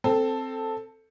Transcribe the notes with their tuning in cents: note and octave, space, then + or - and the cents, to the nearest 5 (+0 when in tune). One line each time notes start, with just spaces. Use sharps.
C4 +0 A4 +5